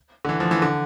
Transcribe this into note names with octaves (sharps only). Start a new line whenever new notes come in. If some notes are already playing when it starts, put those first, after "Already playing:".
D3
E3
F3
E3
D3